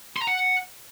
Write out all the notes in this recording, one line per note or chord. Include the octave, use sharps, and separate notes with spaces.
C6
A#5
F#5